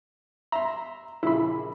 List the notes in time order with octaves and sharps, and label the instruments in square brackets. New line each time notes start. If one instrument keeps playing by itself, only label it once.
[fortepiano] E5 C6 [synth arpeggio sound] A#5
[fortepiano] A#1 C#3 G#4 [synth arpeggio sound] E4 B5